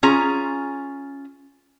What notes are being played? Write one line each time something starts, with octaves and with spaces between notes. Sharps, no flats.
C#4 F4 G#4 A#5